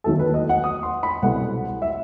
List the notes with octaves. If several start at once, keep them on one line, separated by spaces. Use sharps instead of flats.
D#2 D#3 F#3 A3 A4
B4
D#5
F#5
D#6
C6
B5
C2 B2 F#3 A3 F#5
E5